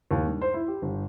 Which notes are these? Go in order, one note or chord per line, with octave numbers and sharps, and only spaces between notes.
D#2
G2
C5
E4
G4
G1